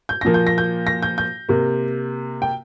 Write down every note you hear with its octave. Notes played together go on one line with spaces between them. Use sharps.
G6
A#2 F3 A#3 A#6
G6
A#6
G6
A#6
G6
G6
C3 A#3
G5